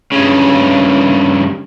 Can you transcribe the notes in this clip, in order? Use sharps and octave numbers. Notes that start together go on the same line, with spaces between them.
G2 C#3